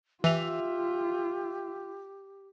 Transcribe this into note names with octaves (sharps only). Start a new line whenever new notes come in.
E3 F4 G4 E5 F7